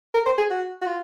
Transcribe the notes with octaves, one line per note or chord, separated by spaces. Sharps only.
A#4
C5
G#4
F#4
F#4
F4